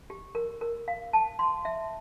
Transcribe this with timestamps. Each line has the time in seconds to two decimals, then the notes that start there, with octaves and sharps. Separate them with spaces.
0.10 G4
0.35 A#4
0.61 A#4
0.88 F5
1.13 A5
1.39 C6
1.65 E5